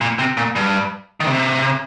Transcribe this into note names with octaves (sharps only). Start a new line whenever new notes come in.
A#2
C3
A#2
G2
D#3
C3